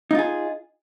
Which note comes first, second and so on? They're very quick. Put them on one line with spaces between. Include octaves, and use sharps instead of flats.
D#4 F4 G#4